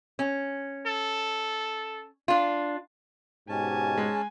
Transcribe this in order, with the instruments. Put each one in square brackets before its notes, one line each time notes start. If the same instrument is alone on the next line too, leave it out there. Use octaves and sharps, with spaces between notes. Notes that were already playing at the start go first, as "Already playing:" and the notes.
[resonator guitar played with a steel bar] C#4
[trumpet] A4
[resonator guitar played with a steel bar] D4 F4
[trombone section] G#2 B2 G4 [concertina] C#4 A5 [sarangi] G#5
[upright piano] G#3